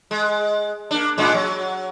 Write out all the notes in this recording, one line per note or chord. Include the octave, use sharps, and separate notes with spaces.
G#3
A#3 D4
A2 G#3 D4
F#3